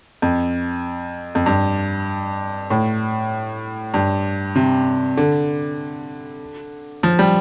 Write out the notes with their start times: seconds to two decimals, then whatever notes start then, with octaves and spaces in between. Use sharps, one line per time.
0.22 F2
1.35 F2
1.46 G2
2.70 A2
3.94 G2
4.56 C3
5.17 D3
7.03 F3
7.19 G3